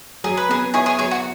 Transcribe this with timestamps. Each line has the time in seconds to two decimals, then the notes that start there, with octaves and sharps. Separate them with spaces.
0.24 F#3 G#4
0.37 B4
0.49 B3 G#4
0.74 E4 G#4 C#5
0.86 G#4 C#5
0.99 F#3 G#4 C#5
1.11 F#4